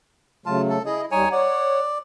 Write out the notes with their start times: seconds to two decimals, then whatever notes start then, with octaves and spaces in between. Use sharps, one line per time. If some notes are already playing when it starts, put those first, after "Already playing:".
0.46 C#3 F#3 A3 F4 A5
0.69 A4
0.86 E4 G#4 D#5
1.12 D#2 G3 D#4 C#5 G#5
1.32 C#5 D5 F#5